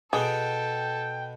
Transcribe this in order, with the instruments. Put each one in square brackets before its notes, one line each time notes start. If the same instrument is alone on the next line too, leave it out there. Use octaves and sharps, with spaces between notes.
[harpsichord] B2 B3 [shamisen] G#4 [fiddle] A4 [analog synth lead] G5